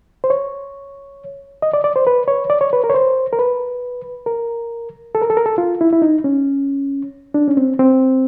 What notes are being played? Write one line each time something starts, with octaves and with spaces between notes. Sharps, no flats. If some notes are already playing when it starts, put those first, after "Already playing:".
C5
C#5
D#5
D5
D5
C5
B4
C#5
D5
C#5
B4
A#4
C#5
C5
A#4
B4
A#4
A4
A#4
A4
A#4
A4
F4
E4
E4
D#4
C#4
D4
C#4
C4
C4